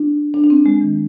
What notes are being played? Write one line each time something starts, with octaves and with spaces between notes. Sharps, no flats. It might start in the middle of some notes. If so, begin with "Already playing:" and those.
Already playing: D4
D4
D4
C4
G#3
D#3